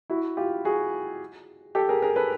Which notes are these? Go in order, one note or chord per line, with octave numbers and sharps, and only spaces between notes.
E4 F#4
F4 G4
F#4 G#4
G4 A4
G#4 A#4
G#4 A#4
A4 B4